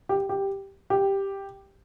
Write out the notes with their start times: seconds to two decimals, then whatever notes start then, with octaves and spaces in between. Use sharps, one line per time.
0.09 G4
0.29 G4
0.90 G4